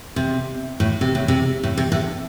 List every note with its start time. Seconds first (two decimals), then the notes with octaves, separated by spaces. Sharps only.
0.16 C3
0.80 A2
1.01 C3
1.15 A2
1.28 C3
1.63 A2
1.77 C3
1.92 A2